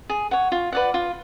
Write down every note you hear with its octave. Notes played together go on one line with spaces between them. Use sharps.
G#4
C#5 F#5
F4
B4 D5 F#5
F4